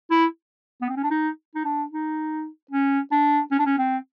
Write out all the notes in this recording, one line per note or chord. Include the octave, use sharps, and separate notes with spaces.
E4
B3
C4
C#4
D4
D#4
D#4
D4
D#4
C#4
D4
C#4
D4
C#4
C4